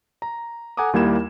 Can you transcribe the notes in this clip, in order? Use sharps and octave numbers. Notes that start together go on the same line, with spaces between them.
A#5
A4 F#5 G#5 A#5 D6 D#6
D#2 G3 A#3 E4 G#6 E7